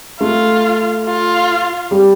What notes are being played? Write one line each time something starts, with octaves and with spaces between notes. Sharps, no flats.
A3 F4
F4
G3